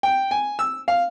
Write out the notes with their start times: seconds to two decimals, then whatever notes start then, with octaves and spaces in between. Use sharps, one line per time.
0.03 G5
0.31 G#5
0.59 E6
0.88 F5